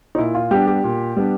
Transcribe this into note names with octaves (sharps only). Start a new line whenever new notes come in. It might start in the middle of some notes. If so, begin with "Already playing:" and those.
D#4
A#2 E4
F4
G3 B3 D4 G4
G4
A#2
G3 B3 D4